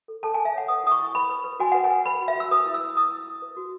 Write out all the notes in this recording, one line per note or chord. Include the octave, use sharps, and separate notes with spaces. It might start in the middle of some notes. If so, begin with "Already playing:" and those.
A4
A4 A5
A4 G#5
E5
C#5 F#5
B4 D#6
E4 D#6
C#6
E4
B4 B5
B4
B4
F#4 G#5
B4 F#5
G#5
B4
B4 B5
F#4
E5
F#4
E6
B4 D#6
E4
E6
B4
E4 D#6
E4
E4
B4
F#4